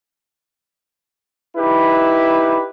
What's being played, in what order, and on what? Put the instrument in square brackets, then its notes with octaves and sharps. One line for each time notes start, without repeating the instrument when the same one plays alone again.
[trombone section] D#4 E4 G4 B4